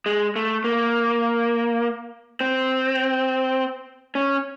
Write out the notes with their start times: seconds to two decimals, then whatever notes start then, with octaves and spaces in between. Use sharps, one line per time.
0.06 G#3
0.36 A3
0.64 A#3
2.41 C4
4.15 C#4